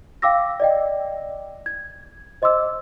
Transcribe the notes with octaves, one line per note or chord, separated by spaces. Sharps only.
F5 G5 D6 E6 A#6
D5 D#5 G5
G#6
C5 D#5 C6 D6 E6